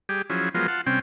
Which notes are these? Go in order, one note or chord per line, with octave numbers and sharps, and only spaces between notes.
G3 G4 G#4
F3 F#3 C#4 E4 G#4
F3 F#3 G#3 B3 F4 A#4
F4 F#5 A5
C3 G3 C4 C#4